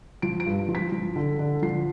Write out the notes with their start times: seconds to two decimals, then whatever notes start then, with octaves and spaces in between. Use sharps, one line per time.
0.22 F3 D7
0.40 D7
0.46 G2
0.69 F3
0.75 B6
0.92 F3
1.16 D3
1.39 D3
1.62 F3 C7